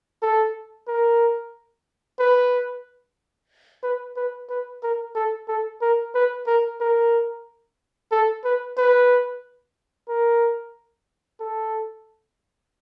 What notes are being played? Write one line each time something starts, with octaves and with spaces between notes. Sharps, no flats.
A4
A#4
B4
B4
B4
B4
A#4
A4
A4
A#4
B4
A#4
A#4
A4
B4
B4
A#4
A4